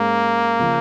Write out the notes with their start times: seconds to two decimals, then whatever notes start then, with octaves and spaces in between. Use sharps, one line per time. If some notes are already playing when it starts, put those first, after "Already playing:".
Already playing: G#2 G#3 A#3 C#4 G#4
0.59 C#3 F3